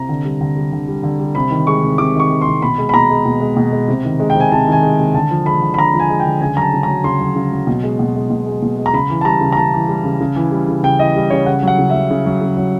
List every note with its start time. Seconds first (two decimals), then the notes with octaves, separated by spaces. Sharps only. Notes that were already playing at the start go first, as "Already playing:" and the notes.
Already playing: C3 A#5
0.09 D3
0.25 G3
0.41 D3
0.56 G3
0.72 D3
0.88 G3
1.03 D3
1.19 G3
1.35 C3 B5
1.51 D#3
1.67 G#3 C#6
1.82 C3
1.98 C3 D6
2.15 D#3 C#6
2.30 G#3
2.41 C3 C6
2.62 B2 B5
2.78 G#3
2.89 B5
2.94 B2 A#5
3.10 G#3
3.25 B2
3.41 G#3
3.57 B2
3.73 G#3
3.88 C3
4.05 D#3
4.20 G#3
4.30 G5
4.35 C3 G#5
4.52 C3 A5
4.68 D#3 G#5
4.83 G#3
4.99 C3
5.14 D3 A5
5.31 F3
5.46 G#3 B5
5.62 D3
5.74 B5
5.78 D3 A#5
5.94 F3
6.00 G#5
6.09 G#3
6.20 G5
6.25 D3
6.41 C#3 G#5
6.57 F#3 A5 A#5
6.73 C#3
6.83 F#3 A#5
7.04 C#3 C6
7.21 F#3
7.35 C#3
7.52 F#3
7.67 B2
7.83 G#3
7.99 B2
8.15 G#3
8.30 B2
8.46 G#3
8.62 B2
8.78 G#3
8.86 A#5
8.93 C#3 B5
9.10 E3
9.21 A5
9.25 G3 A#5
9.41 C#3
9.52 A#5
9.57 C#3 A5
9.73 E3
9.89 G3
10.04 C#3
10.20 C#3
10.36 E3
10.52 G3
10.68 C#3
10.83 C#3 G5
10.99 E3 D#5
11.16 G3
11.30 C#3 C#5
11.46 C#3 F#5
11.63 F#3 F#5
11.78 C#3
11.89 F#3 E5
12.11 C#3
12.26 F#3
12.41 C#3
12.57 F#3